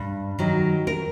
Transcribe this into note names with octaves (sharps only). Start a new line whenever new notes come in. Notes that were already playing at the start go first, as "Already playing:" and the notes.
Already playing: G2
D#3 F#3
A#4